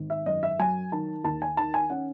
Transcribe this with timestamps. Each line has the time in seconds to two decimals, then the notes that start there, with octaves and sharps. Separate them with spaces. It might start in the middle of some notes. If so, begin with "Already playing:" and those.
Already playing: G#1
0.10 E5
0.26 F#2 D#5
0.43 E5
0.59 F#3 G#5
0.92 D#3 A5
1.24 D#2 A5
1.42 G#5
1.57 D#3 A5
1.74 G#5
1.90 C#4 F#5